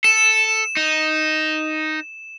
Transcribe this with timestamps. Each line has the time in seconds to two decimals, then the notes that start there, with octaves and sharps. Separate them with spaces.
0.04 A4 E7
0.77 D#4